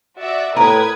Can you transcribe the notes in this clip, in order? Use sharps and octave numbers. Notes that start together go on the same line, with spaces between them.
F#4 D5 E5
A2 A#4 B4 C#5 D#6 G#6